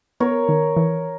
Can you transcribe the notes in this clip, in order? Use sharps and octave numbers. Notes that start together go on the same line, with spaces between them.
B3 A#4 C#5
D#3
E3